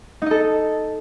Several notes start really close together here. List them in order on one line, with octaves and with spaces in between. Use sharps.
D#4 D#5 A4